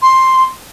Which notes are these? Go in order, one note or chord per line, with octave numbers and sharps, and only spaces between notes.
C6